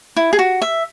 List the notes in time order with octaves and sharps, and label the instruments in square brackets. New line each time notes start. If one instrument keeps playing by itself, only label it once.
[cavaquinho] E4
G#4
F#4
E5